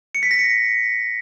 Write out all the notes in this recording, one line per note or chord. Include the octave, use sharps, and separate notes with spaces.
C#7
B6
A#6
C#7